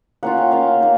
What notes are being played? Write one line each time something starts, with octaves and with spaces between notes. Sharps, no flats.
A#3 C#4 F4 F#5
G5
A#3 C#4 F4 F5
A#3 D#4